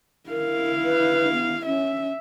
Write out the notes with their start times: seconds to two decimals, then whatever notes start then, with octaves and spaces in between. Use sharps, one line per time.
0.30 E4 A#4 F5
0.85 B4
1.33 B3
1.66 C#4 E5